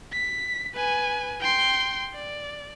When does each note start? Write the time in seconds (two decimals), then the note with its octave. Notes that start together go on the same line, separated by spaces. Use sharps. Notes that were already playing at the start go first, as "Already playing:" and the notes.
0.13 B6
0.75 B4 G#5
1.40 G5 C6
2.14 D5